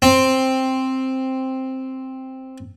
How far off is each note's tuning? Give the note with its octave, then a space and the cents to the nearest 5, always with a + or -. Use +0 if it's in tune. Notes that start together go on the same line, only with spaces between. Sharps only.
C4 +5